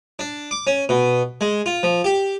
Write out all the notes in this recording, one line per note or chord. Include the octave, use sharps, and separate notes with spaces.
D4
D6
C#4
B2
G#3
F4
F3
G4